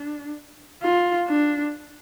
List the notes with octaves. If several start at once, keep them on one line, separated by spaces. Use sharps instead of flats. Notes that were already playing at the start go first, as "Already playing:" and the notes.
Already playing: D4
F4
D4